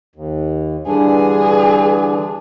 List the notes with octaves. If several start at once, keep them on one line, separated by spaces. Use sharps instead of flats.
D#2
G2 D3 E3 D4 G#4